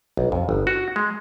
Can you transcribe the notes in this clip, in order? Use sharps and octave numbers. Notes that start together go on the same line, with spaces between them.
B1
F2
G1
F#4
G#3